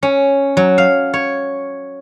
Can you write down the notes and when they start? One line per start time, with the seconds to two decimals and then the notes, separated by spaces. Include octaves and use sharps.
0.03 C#4
0.57 F#3
0.78 F5
1.14 C#5